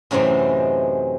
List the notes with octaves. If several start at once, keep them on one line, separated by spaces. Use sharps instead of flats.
F#2 A2 C3 E3 C4 D#4